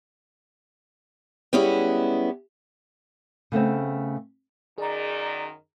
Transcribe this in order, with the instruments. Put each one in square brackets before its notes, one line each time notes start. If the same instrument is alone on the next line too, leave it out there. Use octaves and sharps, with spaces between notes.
[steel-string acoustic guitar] G3 G#3 B3 C#4 E4 G#4
[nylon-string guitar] C#3 A3 B3 C4
[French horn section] F#2 D#3 [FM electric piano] G#4 A#5 [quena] D5